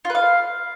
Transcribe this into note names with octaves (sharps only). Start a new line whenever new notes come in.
F4
B4
F5